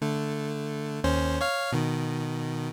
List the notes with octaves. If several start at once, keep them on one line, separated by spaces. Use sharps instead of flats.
D3 A3
D#2 C#4 C5
C#5 F5 F6
B2 D#3